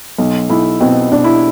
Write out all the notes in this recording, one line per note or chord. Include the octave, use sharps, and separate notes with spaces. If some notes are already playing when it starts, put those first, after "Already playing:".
B1
B1 E4
B2 C4
B2 D4
E4